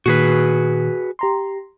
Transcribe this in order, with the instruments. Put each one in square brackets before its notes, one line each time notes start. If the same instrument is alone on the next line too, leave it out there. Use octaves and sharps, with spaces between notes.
[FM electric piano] A#2 D#3 [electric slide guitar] F#4 G#4 B4
[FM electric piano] G4 A#5 C6